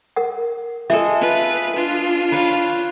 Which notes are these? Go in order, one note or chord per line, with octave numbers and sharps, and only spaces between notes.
A#4 F#5
G#3 G#4 A4 E5
F4 B4
D4 F4
B4 C#5 F5